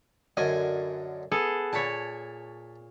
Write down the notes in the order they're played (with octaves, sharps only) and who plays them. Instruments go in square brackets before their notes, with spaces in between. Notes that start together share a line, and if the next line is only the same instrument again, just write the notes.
[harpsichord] F#2 D3 D#5 [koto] G#5
[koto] B3 G#4 A4
[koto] A#2 C#5 [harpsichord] A5 B5